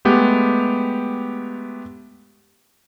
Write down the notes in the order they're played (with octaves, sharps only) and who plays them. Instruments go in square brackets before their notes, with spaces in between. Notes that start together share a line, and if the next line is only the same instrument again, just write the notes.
[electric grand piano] G#3 A3 B3 G4